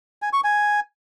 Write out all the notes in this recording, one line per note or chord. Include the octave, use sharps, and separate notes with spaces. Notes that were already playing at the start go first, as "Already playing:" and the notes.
G#5
C#6
G#5